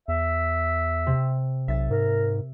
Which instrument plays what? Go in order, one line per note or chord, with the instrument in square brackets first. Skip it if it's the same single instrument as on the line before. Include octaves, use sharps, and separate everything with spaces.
[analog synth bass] E2 [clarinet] E5
[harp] C3
[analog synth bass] B1 [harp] E5 A6
[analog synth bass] G#2 [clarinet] A#4